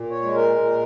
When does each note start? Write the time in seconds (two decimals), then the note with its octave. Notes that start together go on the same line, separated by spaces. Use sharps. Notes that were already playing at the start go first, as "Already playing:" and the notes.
Already playing: A#2
0.11 C#5
0.23 G#3
0.35 A#4
0.59 A#2